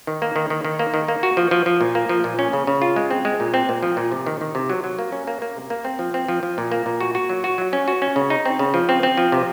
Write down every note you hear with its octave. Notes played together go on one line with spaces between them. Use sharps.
D#3
A#3
D#3
D#3
D#3
A#3
D#3
A#3
F#4
F3
F3
F3
A#2
A#3
F3
A#2
C#4
C#3
C#3
F4
G#3
C4
G#3
A#2
C4
A#2
F3
A#2
C3
D#3
D#3
C3
F#3
F#3
A#3
C#4
A#3
A#3
C3
A#3
C4
F3
C4
F3
F3
A#2
A#3
A#2
F#4
F#4
F#3
F#4
F#3
C#4
F#4
C#4
C#3
D#4
C4
C#3
F3
C4
C4
F3
C3